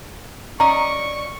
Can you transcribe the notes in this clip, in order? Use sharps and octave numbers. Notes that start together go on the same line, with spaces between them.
C#4 D5 D#5 A#5 C#6